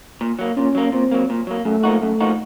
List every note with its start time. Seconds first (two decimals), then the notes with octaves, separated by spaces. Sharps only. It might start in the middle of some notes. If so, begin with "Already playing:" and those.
0.21 A#2
0.39 F#3 A#3
0.56 A#2 C#4
0.75 F#3 A#3
0.92 A#2 C4
1.11 F#3 A#3
1.30 A#2
1.47 F#3 A#3
1.65 F#2 A3
1.83 F3 A#3 D#4 F#4
2.01 F#2 A3
2.20 F3 A#3 D#4 F#4